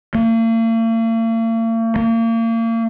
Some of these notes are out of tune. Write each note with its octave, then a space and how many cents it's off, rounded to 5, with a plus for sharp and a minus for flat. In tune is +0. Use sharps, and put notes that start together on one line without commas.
A#3 -45
A#3 -35